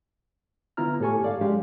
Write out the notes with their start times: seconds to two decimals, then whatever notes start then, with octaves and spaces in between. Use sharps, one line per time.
0.77 D3 B3 E4 F4 A#5 F6
1.00 A2 G4 A4 G#5 C#6
1.22 G#2 D5 F5
1.41 F#3 G#3 C#4 G4 F5